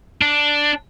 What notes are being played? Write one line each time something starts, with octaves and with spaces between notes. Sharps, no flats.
D4